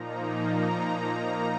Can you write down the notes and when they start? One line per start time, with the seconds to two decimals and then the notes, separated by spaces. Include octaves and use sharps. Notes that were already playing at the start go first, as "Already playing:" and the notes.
Already playing: A#2 F3 A#3 D#4 A#5
0.18 A#5
0.61 A#5